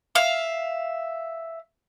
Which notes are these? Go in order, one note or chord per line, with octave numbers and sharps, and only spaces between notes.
E5 F5